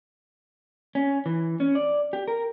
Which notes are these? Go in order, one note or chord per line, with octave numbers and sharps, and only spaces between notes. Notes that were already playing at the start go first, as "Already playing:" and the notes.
C#4
E3
C#4
D5
G4
A#4